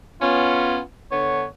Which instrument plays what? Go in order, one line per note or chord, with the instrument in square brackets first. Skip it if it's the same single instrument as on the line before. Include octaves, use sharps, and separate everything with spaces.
[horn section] B3 C#4 [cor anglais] F4
[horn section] D3 B3 [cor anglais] C#5